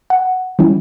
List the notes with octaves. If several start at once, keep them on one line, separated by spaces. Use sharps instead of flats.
F#5
E3 G3 C#4 E4